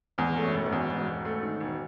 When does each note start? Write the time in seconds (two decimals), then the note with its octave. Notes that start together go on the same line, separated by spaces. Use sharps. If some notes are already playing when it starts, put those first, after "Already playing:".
0.18 E2 G#2
0.36 A3
0.43 F#2
0.54 E1
0.66 G#2
0.72 E2
0.90 E1 G#2
1.07 E1
1.25 A3
1.43 D#3
1.61 E1